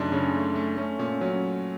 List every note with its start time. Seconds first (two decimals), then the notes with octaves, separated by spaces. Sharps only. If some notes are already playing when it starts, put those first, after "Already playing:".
Already playing: F#2 C#3 A3 D4 D#4 G#4
0.12 C#3 C#4
0.35 A3
0.56 A3
0.77 A3 C#4
0.99 A#2 C#4
1.21 F#3 C#4